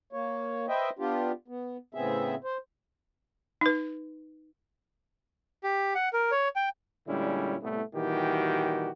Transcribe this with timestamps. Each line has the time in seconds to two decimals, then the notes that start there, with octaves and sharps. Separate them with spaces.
0.13 A#3 C#5
0.69 B4 C5 D#5 E5 G5
0.99 B3 D4 F4 G4
1.48 B3
1.95 A2 C#3 B3 C4 G#4 E5
2.44 C5
3.61 D#4 B4
5.63 G4
5.95 F#5
6.13 A#4
6.32 C#5
6.56 G5
7.07 A#2 D3 G3 G#3 C#4 E4
7.61 C2 A2 A3 B3
7.94 A#2 D#3 E3 G3 F#4 G4